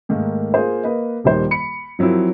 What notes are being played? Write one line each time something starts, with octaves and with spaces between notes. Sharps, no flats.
G#2 D#3 A3 A#3
A#3 F4 G#4 C5
A#3 B4 D#5
D#1 D#3 G3 C5
B5 C#7
F3 F#3 C4 E4 A#4